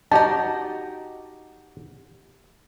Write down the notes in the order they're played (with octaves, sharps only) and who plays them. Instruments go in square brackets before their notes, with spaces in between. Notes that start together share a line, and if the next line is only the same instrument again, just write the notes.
[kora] D#4 G4 [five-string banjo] F#4 D#5 [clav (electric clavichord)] A5